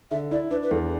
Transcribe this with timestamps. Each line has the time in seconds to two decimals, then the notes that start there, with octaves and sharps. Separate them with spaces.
0.11 D3 E5
0.31 E4 D5
0.51 D4 B4
0.63 B4
0.71 E2 A4